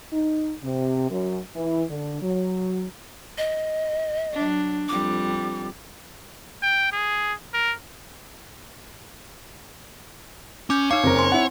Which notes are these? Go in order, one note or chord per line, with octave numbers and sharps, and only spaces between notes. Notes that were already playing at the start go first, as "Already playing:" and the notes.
D#4
C3
F#2
E3
D3
F#3
D#5
F#3 D4
F2 G3 D6
G5
G#4
A#4
C#4 D6 G6
D#4 C#5 F5 D6
F#1 C4 A#4
G#5 C6
E4 F#5